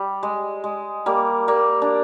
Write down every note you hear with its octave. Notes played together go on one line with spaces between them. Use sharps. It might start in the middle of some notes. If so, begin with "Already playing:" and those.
Already playing: G3
G#3
G#3
G3 A#3
G3 A#3
D4